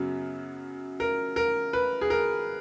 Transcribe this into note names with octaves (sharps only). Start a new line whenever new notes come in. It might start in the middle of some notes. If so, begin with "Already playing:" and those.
Already playing: F#2 C#3 F#3 B3
A#4
A#4
B4
G#4
A#4